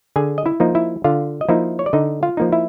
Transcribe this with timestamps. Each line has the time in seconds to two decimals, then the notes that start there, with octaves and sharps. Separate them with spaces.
0.16 D3 G#4 G#5
0.38 D#5
0.46 E4 E5
0.60 F3 A#3 D#4
0.75 E4 E5
1.04 D3 F4 F5
1.41 D#5
1.49 F3 A#3 D#4 E4 E5
1.79 C#5
1.86 D5
1.93 D3 D#4 D#5
2.23 F4 F5
2.37 F3 A#3 D#4
2.52 E4 E5